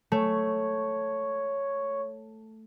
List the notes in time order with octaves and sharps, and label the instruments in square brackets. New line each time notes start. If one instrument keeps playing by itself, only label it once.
[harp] A3 [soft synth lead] C#5